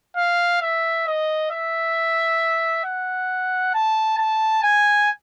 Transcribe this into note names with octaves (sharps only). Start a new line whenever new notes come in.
F5
E5
D#5
E5
F#5
A5
A5
G#5